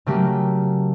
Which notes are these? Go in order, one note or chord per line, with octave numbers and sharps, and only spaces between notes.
C#3 F#3 A3 A#3 G4